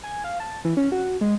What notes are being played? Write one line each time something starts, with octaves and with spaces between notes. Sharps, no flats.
G#5
F5
A5
E3
C#4
F#4
G#3